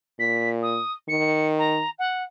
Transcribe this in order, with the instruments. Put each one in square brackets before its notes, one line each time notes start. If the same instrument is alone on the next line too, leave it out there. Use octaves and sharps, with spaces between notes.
[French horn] A#2 [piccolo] B6
[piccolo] D#6
[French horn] D#3 [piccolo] C#7
[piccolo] A#5
F#5